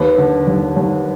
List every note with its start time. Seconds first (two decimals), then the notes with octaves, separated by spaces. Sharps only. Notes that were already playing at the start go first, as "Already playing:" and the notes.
Already playing: D#2 B4
0.18 D3
0.47 D#2
0.76 D#2